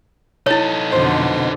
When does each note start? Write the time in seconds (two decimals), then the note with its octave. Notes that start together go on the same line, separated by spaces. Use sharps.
0.47 D#4 E4 A4 C#5
0.92 F2 B2 D3 C5